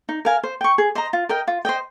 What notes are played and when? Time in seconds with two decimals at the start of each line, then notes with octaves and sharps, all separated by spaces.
0.09 D#4
0.25 A#4 F5 G#5
0.44 C5
0.61 G5 C#6
0.78 G#4
0.95 C5 D#5 A#5
1.13 F4
1.29 A#4 D#5 G5
1.48 F4
1.65 C5 D#5 G5